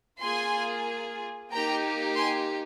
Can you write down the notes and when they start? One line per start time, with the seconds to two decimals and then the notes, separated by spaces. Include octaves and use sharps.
0.22 A#3 F4 G#4 G#5 C6
1.52 A#3 D#4 G4 G5 A#5
2.17 G#5 C6